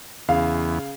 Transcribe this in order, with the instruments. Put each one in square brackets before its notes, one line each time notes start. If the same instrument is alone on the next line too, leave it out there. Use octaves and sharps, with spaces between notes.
[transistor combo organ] E2 [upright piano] C#3 F5